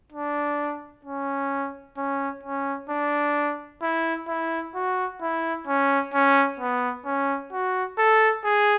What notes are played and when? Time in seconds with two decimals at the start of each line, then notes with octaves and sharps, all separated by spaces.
0.12 D4
1.04 C#4
1.97 C#4
2.43 C#4
2.89 D4
3.82 E4
4.28 E4
4.75 F#4
5.21 E4
5.67 C#4
6.14 C#4
6.59 B3
7.06 C#4
7.52 F#4
7.98 A4
8.44 G#4